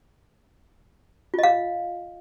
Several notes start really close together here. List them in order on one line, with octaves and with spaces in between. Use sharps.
F4 D#5 F5